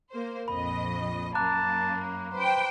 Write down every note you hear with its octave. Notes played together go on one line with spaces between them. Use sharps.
A#3 C5
A#1 F2 D#5 B5
F#2 A#3 A5 A#5 D6 F#6
B4 C5 G5